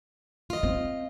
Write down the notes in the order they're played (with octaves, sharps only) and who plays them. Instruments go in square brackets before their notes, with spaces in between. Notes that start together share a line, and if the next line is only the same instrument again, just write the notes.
[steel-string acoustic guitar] F4 D#5
[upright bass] C4